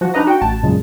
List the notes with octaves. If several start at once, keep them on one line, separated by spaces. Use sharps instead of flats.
F3 F#4
D4 D#4 B4 D#5 A#5
F#4 G5
A1 A5
F#2 A#2 C#3 G#3